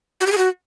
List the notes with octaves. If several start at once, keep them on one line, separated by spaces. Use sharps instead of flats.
F#4
G4
G#4
F#4